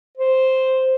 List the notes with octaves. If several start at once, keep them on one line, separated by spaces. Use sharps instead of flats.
C5